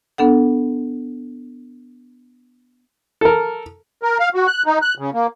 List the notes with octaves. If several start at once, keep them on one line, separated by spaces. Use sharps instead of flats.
B3 D4 A4 F#5
A4 A#4
A#4
F5
F#4
F#6
D#4
F#6
C#3
A#3